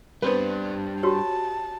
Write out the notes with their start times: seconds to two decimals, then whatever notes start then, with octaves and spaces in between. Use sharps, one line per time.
0.22 G3 B3 C4 D4 B4
1.03 F#4 G4 C#5 A5